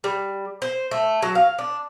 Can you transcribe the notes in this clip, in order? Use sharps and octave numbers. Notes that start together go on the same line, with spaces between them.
G3
C5
A3
F#3
F5
D4